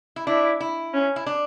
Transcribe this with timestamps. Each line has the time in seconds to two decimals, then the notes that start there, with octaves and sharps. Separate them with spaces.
0.16 E4
0.27 D4 E4
0.61 E4
0.94 C#4
1.16 E4
1.26 D4